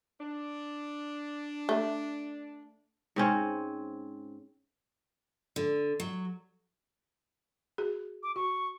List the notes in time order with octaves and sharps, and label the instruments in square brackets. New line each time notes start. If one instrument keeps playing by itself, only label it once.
[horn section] D4
[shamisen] A3
[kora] G#2 C4 C#4
[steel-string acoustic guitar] D3
F#3
[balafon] F#4 G#4
[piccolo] D6
[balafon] F#4 [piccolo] C#6